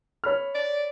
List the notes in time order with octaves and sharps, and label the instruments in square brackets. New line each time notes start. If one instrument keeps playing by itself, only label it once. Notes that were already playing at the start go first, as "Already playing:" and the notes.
[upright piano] C#5 B5 F6
[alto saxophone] D5